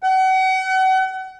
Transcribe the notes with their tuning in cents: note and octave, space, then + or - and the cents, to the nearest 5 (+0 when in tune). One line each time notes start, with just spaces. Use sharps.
F#5 +35